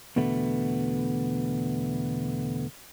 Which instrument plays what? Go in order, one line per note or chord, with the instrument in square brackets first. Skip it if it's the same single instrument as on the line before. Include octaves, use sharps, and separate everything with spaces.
[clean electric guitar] E2 B2 D3 A3 B3